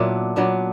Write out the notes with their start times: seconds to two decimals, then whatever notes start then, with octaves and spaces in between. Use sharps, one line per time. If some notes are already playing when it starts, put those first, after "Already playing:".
Already playing: A#2 F#3 B3 D4 E4
0.36 A#2 F#3 B3 D4